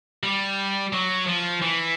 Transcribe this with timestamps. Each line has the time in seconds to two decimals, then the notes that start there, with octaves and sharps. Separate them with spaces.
0.23 G3
0.93 F#3
1.27 F3
1.62 E3